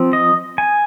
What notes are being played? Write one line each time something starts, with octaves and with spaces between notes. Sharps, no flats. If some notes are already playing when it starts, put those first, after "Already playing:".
Already playing: F3 C4
D#5
G#5